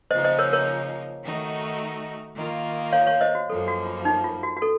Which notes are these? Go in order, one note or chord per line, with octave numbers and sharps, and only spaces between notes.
C#3 F3 A#3 D#4 C5 D#5
C5 D#5
A#4 C#5
A#4 C#5
D#3 A3 D#4 F#4
D#3 A#3 F4
C#5 F5
C#5 F5
C5 D#5
F#4
F#2 F3 A#3 A4
F#4
F4
D#4
F4
F#4
F#4
A4